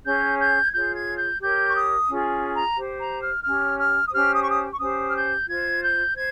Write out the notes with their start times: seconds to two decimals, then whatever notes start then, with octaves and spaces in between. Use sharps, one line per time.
0.05 C#4 G#4 C#5 G6
0.39 G6
0.62 G#6
0.72 F4 G#4 C#5 G6
0.95 G#6
1.18 G6
1.40 G4 A#4 C#5 G6
1.69 C#6
1.75 D#6
2.08 C#4 F4 G#4
2.54 A#5
2.76 G4 C5
3.00 A#5
3.22 F6
3.44 C#4 G4 C#5 F6
3.78 F6
4.07 D#6
4.12 C#4 G4 C5 F6
4.35 D#6
4.43 C#6
4.50 D#6
4.72 C#6
4.79 C#4 G4 C5 D#6
5.09 F6
5.14 G6
5.47 F4 C5 G#6
5.82 G6
6.15 C5 G#6